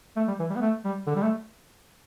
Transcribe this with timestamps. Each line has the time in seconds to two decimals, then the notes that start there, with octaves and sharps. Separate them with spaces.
0.16 A3
0.28 G3
0.39 E3
0.50 G3
0.56 B3
0.61 A3
0.85 G3
1.07 D3
1.15 G3
1.22 A3